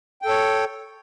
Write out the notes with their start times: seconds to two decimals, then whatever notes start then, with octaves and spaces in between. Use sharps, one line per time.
0.22 G5
0.25 A4
0.29 C#5